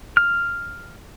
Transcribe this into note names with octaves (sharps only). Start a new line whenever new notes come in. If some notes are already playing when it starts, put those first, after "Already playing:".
F6